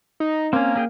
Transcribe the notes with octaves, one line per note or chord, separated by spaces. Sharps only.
D#4
A#3 C4 C#4
C#4 G#4 G5